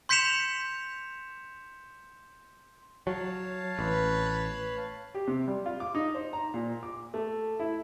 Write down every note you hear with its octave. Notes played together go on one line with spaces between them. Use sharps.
C6 G6 B6 C#7 E7 F7
F#3 C#5 F5 A5
A1 B4
G4
C3
G3
F4
D6
D#4
C5
A#5
A#2
D6
A3
E4